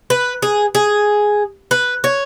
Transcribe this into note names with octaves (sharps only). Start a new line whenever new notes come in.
B4
G#4
G#4
B4
C#5